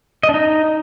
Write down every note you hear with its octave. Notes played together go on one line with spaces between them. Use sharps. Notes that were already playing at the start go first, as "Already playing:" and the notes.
D#5
D4
D#4